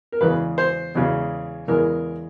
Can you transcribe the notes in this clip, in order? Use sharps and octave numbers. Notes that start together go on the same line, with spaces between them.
A#4
E2 C#3 E3 G#3 B3 B4
C5
E2 C#3 E3 G#3 B3
E2 C#3 E3 G#3 B3 A#4